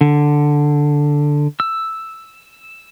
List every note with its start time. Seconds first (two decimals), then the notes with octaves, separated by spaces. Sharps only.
0.01 D3
1.60 E6